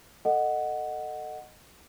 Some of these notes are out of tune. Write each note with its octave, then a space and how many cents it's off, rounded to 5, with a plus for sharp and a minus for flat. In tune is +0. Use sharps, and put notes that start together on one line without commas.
A4 +15 D#5 -15 F#5 +0